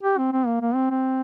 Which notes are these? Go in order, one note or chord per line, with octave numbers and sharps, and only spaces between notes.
G4
C4
C4
A#3
A#3
C4
C4